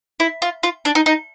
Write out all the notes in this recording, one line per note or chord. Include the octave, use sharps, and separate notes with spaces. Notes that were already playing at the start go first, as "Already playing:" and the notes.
E4
F4
F4
D4
D#4
D#4